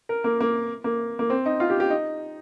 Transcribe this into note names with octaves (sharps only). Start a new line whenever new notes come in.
A#4
A#3
A#3
A#3
A#3
C4
D#4
F4
G4
G4
D#4